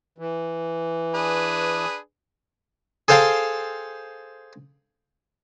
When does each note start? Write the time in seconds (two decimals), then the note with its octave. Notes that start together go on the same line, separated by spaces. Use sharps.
0.18 E3
1.14 D4 G#4 B4
3.08 G#4 A4 C5 F5 G5 A5